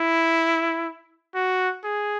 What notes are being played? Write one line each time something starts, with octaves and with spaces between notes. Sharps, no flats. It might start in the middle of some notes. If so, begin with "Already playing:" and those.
Already playing: E4
F#4
G#4